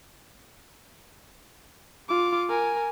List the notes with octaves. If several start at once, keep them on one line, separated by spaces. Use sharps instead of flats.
F4 D6
A#4 G#5